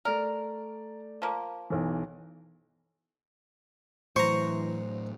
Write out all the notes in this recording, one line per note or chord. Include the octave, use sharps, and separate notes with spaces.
A3 A#4 D5
F3 A#3
B1 E3
A2 E3 F#3 C5 A#5 C#6